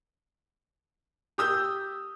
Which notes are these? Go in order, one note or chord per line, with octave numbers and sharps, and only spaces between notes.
G4 D#6 E6 G6